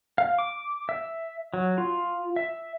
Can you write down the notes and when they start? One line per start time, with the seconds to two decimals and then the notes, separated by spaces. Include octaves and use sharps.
0.18 F5
0.38 D6
0.89 E5
1.54 F#3
1.78 F4
2.36 E5